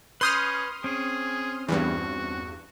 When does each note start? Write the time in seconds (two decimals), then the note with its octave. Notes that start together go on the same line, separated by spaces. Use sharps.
0.21 C#4 B4 C6 D#6 F6 G6
0.84 C4 C#4 G#4
1.68 E2 G2 F#4